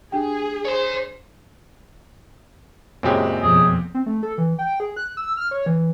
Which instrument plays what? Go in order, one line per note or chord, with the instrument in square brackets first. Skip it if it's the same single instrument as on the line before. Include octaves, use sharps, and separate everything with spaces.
[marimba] D4 G4 G5 [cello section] G#4
[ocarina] C5 [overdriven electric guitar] C#5 C6
[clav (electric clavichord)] F#2 C#3 G#3 [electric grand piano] A#2 C4 G4
[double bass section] F2 B2 [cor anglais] G#4
[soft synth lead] C4
A3
A4
E3
G5
G#4
F#6
E6
F6
C#5
E3